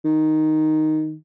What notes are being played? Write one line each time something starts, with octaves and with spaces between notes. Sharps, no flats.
D#3